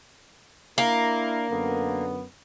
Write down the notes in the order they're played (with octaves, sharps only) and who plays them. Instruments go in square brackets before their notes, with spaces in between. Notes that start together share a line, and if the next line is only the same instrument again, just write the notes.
[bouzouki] A#3 [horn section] D4 E4 A#4
[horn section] F#2 D3 B3